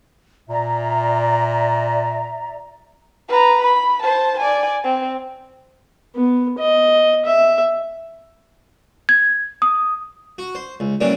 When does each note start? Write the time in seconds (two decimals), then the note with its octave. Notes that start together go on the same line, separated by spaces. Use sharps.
0.49 A#2 D5 E5 A#5
3.28 B4 A#5
3.63 B5
4.02 C5 A5
4.40 D5 G#5
4.84 C4
6.15 B3
6.59 D#5
7.26 E5
9.09 G#6
9.62 D#6
10.38 F#4
10.55 C5
10.80 C#2
11.01 C#3 E3 F#3 G3 A#3 D4